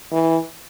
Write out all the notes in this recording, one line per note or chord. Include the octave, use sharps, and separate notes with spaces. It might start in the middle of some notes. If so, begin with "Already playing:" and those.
E3